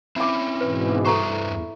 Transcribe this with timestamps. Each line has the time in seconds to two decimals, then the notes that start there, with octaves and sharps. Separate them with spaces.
0.16 C4 C#4 E4 D6
0.61 G#2 B2 E3 B4
1.05 G2 A4 B4 C5 A#5 C#6
1.43 E2